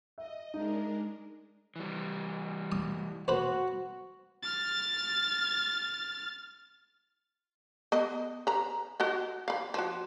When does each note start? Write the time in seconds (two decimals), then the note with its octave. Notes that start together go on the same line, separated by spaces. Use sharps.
0.18 D#5 E5
0.54 G#3 D4 D#4 A#4
1.76 E3 G3
2.72 D#6
3.28 F#4 B4 C5
4.43 F6 A6
7.92 B3 D#5
8.47 B4 A#5
9.00 F#4 D#5 F#5
9.48 F5 B5
9.74 F3 F#4